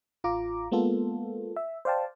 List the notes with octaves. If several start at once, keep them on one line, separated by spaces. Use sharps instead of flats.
A1 F4 A#5 D6
G#3 A#3 B3 F4 A4
E5
C5 D5 F5 G5 A5